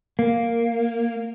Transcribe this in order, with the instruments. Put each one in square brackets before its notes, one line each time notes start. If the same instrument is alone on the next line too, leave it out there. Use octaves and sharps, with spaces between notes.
[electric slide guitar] A#3